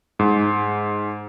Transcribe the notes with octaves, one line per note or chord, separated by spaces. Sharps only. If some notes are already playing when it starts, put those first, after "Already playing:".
G#2